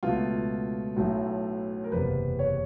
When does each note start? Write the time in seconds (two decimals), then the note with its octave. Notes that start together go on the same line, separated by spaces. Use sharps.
0.03 C#2 B2 F#3 A3 F4
0.96 B1 A2 F#3 A3
1.84 A#4
1.92 F#1 E2 C3 B4
2.39 C#5